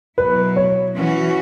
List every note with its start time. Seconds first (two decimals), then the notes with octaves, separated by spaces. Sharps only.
0.18 B2 F#3 E4 B4
0.56 C#5
0.95 E3 C#4 F#4